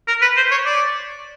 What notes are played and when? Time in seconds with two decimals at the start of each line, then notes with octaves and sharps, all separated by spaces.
0.08 A#4
0.22 B4
0.37 C5
0.51 C#5
0.66 D5